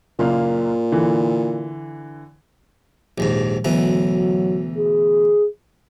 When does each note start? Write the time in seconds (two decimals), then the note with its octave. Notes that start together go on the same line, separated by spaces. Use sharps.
0.19 F#1 A#2 A#3 F5
0.92 D3 E3
3.18 A#1 D#2 G#2
3.65 D2 B2 E3 F#3
4.78 G#4